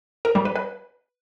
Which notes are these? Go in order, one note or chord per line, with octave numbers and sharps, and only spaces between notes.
A#4
G3
B4
B4